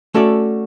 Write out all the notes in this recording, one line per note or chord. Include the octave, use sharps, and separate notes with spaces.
A3 C#4 F#4 A4 D5